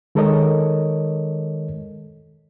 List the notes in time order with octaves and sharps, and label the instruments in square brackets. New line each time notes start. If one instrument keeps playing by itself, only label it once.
[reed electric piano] D#3 G#3 A4 A#4 C#5 D#5